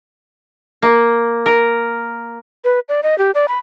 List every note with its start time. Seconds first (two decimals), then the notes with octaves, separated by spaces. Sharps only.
0.82 A#3
1.46 A#4
2.64 B4
2.89 D5
3.03 D#5
3.18 G4
3.35 D5
3.48 B5